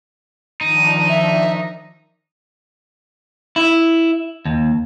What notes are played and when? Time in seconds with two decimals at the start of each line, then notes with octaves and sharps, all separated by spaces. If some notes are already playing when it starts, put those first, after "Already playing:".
0.61 D#3 F3 D4 D#4
1.09 E5
3.56 E4
4.45 D#2